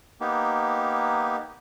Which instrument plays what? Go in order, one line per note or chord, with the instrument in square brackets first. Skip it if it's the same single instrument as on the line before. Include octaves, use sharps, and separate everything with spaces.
[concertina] A#3 B3 D#4 G4